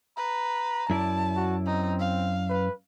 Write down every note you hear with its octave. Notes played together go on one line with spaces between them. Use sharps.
B4 A#5
F#2 E4 D5 A5
F#4
C4 D#4
F5
B4